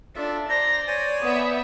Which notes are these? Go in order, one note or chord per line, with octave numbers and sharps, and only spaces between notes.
D4 F4 A4 E5
C5 D5 A#5 C6 A#6
C5 C#5 G#5 A6
B3 E5 D#6